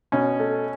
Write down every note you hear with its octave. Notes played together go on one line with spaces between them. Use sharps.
B2 C#4
A3